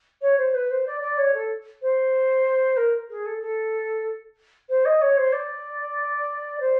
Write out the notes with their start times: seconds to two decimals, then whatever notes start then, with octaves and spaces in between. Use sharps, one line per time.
0.21 C#5
0.37 C5
0.54 B4
0.70 C5
0.86 D5
1.01 D5
1.18 C#5
1.34 A4
1.82 C5
2.77 A#4
3.10 G#4
3.26 A4
3.41 A4
4.69 C5
4.85 D#5
5.01 C#5
5.17 C5
5.32 D5
6.60 C5